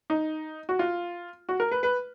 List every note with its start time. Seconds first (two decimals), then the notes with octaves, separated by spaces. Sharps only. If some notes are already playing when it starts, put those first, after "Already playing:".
0.10 D#4
0.69 F#4
0.79 F4
1.49 F#4
1.60 A#4
1.71 B4
1.83 B4